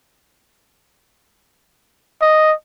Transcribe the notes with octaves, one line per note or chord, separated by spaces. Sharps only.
D#5